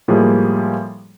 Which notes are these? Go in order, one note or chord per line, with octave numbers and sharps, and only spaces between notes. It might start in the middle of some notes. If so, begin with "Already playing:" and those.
A2 F3 G3 G#3 A#3 G#4